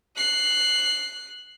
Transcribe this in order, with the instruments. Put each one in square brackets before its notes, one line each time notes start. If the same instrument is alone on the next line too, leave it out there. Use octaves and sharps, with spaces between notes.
[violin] F#6 C7